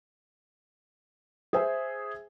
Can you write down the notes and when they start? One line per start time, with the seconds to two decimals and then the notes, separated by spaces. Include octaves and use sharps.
1.53 G#4 C5 E5 G#5